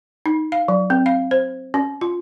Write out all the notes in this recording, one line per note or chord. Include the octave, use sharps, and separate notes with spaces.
D#4
F5
F#3
C4
F5
C5
C#4
F4